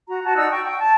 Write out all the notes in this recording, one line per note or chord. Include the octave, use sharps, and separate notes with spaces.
F#4 A#5
F#4 A5
D#4 D5 F#5 E6
G5 C#6
G5
A5